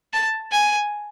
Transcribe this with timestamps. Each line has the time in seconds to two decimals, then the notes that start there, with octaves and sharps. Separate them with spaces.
0.13 A5
0.52 G#5